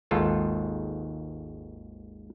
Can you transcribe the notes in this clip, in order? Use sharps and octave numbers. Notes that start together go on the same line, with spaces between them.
G#1 D#2 G#2 F4 A4